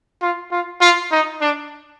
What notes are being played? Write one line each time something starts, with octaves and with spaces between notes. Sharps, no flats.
F4
F4
F4
D#4
D4